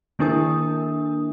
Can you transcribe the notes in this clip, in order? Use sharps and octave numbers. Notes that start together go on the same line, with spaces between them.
D#3 A#3 D4 E4 A#4 D#6